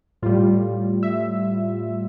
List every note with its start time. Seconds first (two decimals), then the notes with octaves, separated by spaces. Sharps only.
0.22 A2 G3 F4
1.03 E5